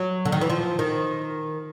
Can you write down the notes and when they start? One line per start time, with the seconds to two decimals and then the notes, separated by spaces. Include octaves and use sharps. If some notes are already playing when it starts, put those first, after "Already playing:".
Already playing: F#3
0.25 D3
0.32 D#3
0.41 E3
0.50 F3
0.79 D#3